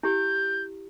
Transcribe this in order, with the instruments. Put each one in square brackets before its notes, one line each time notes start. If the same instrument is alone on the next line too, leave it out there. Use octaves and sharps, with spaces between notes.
[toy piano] E4 G4 [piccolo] G6